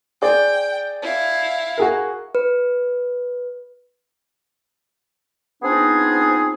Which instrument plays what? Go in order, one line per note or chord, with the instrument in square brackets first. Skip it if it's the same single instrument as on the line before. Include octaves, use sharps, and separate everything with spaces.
[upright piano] G#4 C5 D5 [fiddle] G5
[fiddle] E4 F5
[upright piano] F#4 G#4 A#4
[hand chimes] B4
[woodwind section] B3 C4 D4 D#4 F4 G#4